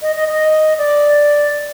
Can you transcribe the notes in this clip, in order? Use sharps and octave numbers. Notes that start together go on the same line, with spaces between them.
D#5
D#5
D#5
D5